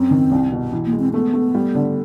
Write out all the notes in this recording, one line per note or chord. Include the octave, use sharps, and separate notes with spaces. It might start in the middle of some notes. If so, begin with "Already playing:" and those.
Already playing: F#2 C4
D#3
C2
B2
E3
A#3
G#3
C4
A3 B3
A3
G3
D3